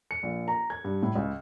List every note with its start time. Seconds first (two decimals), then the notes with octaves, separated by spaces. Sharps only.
0.11 C#7
0.23 A#1
0.48 A#5
0.70 G#6
0.84 G2
1.03 A2
1.15 C#2